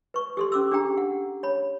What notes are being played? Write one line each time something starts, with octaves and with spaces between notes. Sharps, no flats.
B4 C#6
G4 A4 C6
C#4 D6 E6
D4 G4 G#4 G5 A#5
F#5
C#5 B5